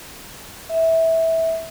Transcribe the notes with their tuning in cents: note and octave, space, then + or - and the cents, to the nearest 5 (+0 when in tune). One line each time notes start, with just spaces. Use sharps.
E5 -15